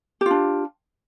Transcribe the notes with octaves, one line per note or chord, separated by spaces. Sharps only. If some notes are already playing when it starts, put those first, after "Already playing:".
D4 F4 G4